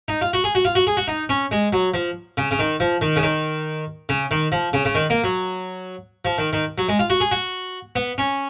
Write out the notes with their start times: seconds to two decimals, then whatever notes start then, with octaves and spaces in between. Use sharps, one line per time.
0.08 D#4
0.21 F4
0.33 F#4
0.44 G#4
0.55 F#4
0.65 F4
0.75 F#4
0.87 G#4
0.97 F#4
1.08 D#4
1.29 C#4
1.51 G#3
1.73 F#3
1.94 F3
2.37 C#3
2.51 C#3
2.59 D#3
2.80 F3
3.01 D#3
3.16 C#3
3.23 D#3
4.09 C#3
4.31 D#3
4.52 F3
4.73 C#3
4.85 C#3
4.95 D#3
5.10 A#3
5.24 F#3
6.25 F3
6.38 D#3
6.53 D#3
6.78 F#3
6.88 G#3
6.99 F4
7.10 F#4
7.20 G#4
7.31 F#4
7.96 B3
8.18 C#4